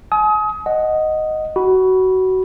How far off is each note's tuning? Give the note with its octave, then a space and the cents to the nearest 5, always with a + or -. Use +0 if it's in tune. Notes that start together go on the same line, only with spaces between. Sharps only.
G#5 +40 D#6 +30
D#5 +0 F#5 +0
F#4 +20 B5 -10